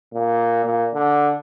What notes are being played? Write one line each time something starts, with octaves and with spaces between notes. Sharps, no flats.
A#2
A#2
D3